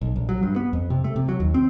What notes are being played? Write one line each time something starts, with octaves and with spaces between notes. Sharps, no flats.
B1
A#1
F#3
G2
B3
F2
C3
A3
C3
F#3
D#2
C4